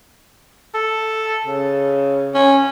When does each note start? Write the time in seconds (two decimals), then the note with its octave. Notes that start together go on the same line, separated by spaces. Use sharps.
0.75 A4
1.46 C#3
2.34 C#4